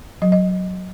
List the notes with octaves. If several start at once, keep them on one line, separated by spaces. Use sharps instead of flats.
F#3 D#5
D#5